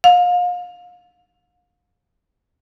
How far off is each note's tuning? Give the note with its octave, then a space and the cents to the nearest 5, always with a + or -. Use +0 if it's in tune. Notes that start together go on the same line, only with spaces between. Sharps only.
F5 +35